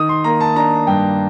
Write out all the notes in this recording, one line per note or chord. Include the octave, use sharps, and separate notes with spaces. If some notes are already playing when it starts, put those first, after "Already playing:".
Already playing: D#3 D#6
C6
A#3 A#5
A5
D4 A#5
G2 G5